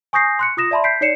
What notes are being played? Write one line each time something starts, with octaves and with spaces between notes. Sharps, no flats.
G#5 C#6 D#6 G6 A#6 C7
C6 F#6 C#7
F4 D#6 A#6 E7
D5 E5 A5 B5 C6
G6 B6 C7 D7
D#4 C#5 D5 C7 C#7 E7